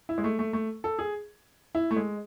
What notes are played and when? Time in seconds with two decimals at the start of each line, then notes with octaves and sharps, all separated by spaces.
0.09 E4
0.18 G#3
0.24 A3
0.39 A3
0.53 A3
0.84 A4
0.99 G#4
1.75 E4
1.91 A3
1.97 G#3